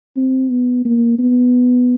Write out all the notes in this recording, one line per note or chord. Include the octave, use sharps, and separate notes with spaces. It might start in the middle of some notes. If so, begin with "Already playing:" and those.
C4
B3
A#3
B3